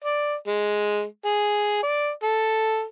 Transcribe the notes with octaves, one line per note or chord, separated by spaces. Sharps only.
D5
G#3
G#4
D5
A4